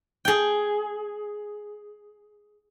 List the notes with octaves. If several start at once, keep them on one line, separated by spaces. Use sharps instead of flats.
G#4 G5